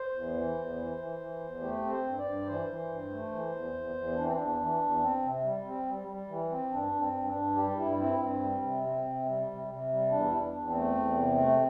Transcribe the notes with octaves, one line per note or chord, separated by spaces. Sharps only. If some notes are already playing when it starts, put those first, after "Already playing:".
Already playing: C5
E2
E3
E2
E3
E3
E3
E2
A3 G4
C4
C5
G2
D5
G2
E3 C5
E3
G2
A3
E3
E2
E2
E2
E3 D4
C4
E2 D4
E3
E2
C4
C3
G3
C4
G3
G3
E3
C4
G2 D4
G2
C4
G2
D4
G2
G3 G4
G2 E4
C4 E4
G2 C4
G3
C3
C4
C3
G3
C3
C3
G3
E2 D4
E2 E4
D4
E2
C4
A3
E2
C3
A3